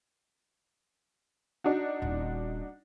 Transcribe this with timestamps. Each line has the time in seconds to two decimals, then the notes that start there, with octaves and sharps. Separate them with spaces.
1.64 D4 D#4 F#4
2.02 D#1 A#2